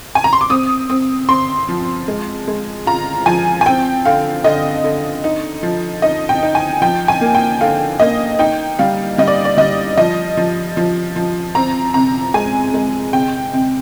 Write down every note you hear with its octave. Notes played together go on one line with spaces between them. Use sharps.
G#5
A#5
C6
D6
C4 D#6
C4
C4 C6
F3
G#3
G#3
F4 A#5
F3 G#5
G#5
C4 G5
D3 F5
D3 D#5
D3
D#4
F3
D#4 D#5
G5
D#4
G#5
F3 G5
G#5
A#3
G5
D3 F5
A#3 D#5
D#4 G5
G3 F5
G3 D#5
D5
D5
G3 D#5
F3 D#5
F3
F3
F3
C4 A#5
C3 A#5
G#3 G#5
G#3
C3 G5
C3